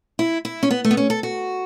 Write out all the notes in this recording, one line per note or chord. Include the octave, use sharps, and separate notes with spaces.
E4
E4
C#4
B3
A3
B3
C#4
A4
F#4